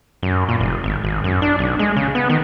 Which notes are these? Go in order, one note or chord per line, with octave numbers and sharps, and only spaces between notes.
F#2
A#2
F1
G#1
G#1
F#2
D4
B1
G#3
C#3
B3
D#3